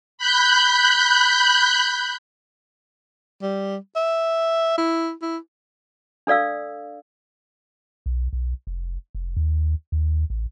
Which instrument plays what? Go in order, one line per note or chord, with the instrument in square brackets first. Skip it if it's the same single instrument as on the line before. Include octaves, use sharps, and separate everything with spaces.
[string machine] B5 F#6 G6
[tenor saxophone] G3
E5
E4
E4
[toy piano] D4 A4 D5 F5 E6
[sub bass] B1
B1
F1
F1
D#2
D#2
A1